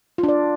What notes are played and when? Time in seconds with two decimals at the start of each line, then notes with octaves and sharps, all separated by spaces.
0.18 F4
0.23 D4
0.29 D5